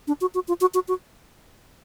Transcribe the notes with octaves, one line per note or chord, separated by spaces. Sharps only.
D4
F#4
F#4
F4
F#4
F#4
F#4